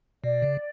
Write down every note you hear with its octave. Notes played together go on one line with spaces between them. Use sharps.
B2 D5
C#3